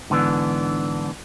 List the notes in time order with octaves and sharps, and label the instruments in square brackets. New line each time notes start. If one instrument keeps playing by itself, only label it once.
[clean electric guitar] G#2 D3 E3 B3 D4